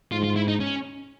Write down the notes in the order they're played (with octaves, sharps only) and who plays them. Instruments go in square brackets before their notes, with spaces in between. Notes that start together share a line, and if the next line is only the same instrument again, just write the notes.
[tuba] G#2 [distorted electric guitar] F4
[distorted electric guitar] F4
E4
D#4
C#4